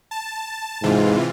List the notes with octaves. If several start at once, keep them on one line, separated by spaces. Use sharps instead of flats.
A5
G#2 C3 E3 F4